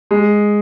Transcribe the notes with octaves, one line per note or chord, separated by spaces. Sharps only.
G#3